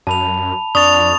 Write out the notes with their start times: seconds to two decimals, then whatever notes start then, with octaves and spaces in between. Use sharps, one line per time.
0.07 F#2 A5 B5 F7
0.75 F2 D4 C#6 D#6 A6 F7